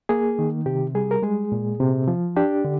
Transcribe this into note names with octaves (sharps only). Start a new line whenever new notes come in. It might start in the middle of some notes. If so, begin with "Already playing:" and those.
A#3 G#4
D#3
C3 G4
G3 G#4
A#4
G#3 G#4
A#2
C3
F3
D4 G4
D3